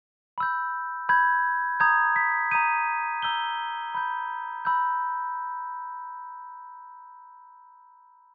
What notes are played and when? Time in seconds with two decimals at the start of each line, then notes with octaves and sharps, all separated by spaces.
0.38 B5 E6 G6
1.09 B5 G6 G#6
1.80 A#5 D#6 G6 G#6
2.16 B6
2.51 A#5 D#6 G6 D#7
3.22 A#5 E6 G6 G7
3.95 B5 G6
4.65 B5 E6 G6